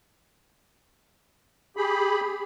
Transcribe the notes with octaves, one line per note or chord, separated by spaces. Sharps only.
G4 G#4 B5